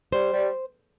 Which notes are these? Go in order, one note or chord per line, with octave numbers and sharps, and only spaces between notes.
G3 C5
G3